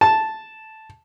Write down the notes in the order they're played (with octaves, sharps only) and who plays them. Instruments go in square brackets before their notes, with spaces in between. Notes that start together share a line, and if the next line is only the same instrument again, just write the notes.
[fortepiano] A5